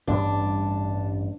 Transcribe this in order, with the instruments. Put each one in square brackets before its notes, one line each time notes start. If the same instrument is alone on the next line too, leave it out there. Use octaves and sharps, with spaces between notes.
[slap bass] A1 G2 G3 [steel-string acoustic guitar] D4